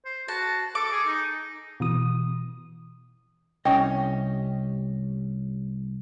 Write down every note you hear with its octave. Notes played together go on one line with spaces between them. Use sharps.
C5
F#4 A5
A4 D6
G#4
D#4
B2 E3 D#6
C2 C#4 G4 D#5